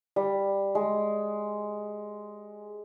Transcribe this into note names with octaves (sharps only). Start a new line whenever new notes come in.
G3
G#3